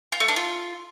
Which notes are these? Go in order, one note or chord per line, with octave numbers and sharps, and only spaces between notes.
F4
A3
D4
F4